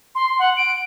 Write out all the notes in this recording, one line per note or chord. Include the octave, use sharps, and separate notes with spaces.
C6
F#5
D7